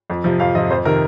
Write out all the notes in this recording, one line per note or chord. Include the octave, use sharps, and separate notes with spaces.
F2
C3 F3
F2 F5
C3 F3 D#5
F2 C5
C3 D#3 A#4